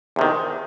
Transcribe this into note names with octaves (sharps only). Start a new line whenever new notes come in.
E2 C3 D#3